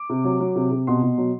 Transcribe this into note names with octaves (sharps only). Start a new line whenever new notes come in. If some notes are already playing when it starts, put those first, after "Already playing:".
Already playing: D6
C3
F#3
F#3
C3
C3
B2 C6
B2
F#3